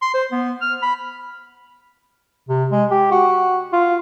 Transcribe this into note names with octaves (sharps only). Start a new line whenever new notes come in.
C6
C5
B3
F6
B5
C3
G#3
G4
F#4
F4